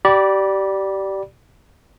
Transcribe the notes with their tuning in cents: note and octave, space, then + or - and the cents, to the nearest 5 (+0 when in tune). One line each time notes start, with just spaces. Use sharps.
G4 -25 D5 +0 B5 -25